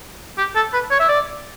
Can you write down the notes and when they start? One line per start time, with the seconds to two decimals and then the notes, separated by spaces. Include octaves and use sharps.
0.38 G4
0.56 A4
0.73 B4
0.91 C#5
1.00 E5
1.09 D5